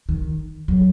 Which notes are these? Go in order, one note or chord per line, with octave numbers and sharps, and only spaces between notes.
D#3
F#3